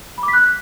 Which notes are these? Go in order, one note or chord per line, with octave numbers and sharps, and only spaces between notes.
B5
D6
B6
F#6